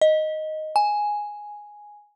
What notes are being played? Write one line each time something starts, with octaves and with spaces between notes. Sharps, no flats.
D#5
G#5